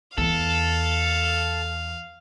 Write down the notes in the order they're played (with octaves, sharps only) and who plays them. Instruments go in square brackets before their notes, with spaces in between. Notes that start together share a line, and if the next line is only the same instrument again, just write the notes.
[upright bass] E2 [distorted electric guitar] A4 [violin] F5